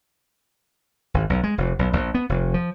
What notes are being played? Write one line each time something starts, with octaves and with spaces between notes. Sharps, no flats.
G#1
B1
G#3
F1
B1
A#1
B3
F1
F3